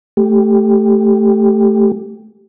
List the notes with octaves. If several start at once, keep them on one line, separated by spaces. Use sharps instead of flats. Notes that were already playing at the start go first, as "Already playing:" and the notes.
A3 G4